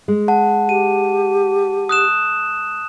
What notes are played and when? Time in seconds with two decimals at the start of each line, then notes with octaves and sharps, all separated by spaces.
0.08 G#3
0.28 F#5 A5
0.69 G4 D#7
1.89 D#6 F#6 E7